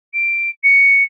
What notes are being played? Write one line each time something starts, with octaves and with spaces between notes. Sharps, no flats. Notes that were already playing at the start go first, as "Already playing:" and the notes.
D7
C#7